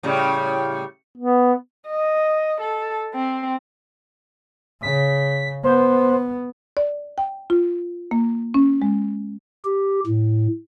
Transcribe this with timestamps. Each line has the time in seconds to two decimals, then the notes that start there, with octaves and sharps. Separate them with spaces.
0.03 A2 C#3 G3
1.18 B3
1.88 D#5
2.61 A4
3.14 C4
4.83 C#3 B6
5.64 B3 C5
6.77 D5
7.18 G5
7.50 F4
8.11 A#3
8.54 C#4
8.82 G#3
9.65 G4
10.07 A2